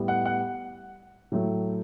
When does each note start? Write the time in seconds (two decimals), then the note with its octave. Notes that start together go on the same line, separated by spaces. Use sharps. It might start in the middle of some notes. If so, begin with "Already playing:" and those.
Already playing: A2 G3 B3
0.08 F#5
0.25 F#5
1.32 A2 F#3 A3